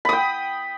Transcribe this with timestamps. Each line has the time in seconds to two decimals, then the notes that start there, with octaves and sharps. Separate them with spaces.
0.05 B5
0.09 D#6
0.13 G5